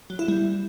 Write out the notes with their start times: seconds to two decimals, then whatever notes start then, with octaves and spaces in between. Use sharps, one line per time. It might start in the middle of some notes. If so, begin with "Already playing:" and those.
0.10 F#3
0.19 E4
0.28 G3